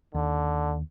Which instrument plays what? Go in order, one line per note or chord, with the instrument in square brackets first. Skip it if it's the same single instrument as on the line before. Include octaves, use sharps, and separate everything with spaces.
[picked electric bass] D#2 [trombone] D3